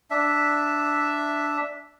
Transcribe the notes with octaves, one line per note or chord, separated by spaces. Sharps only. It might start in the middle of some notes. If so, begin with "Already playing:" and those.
D4 E5